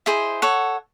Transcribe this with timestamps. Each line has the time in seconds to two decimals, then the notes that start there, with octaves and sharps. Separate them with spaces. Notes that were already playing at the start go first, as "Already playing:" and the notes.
0.06 E4 G#4 C5 D#5
0.42 A4 C#5 F#5